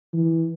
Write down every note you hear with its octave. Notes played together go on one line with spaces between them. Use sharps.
E3